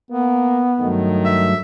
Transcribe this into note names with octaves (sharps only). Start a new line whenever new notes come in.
A#3 B3
G2 D#3 F#3 A3
E5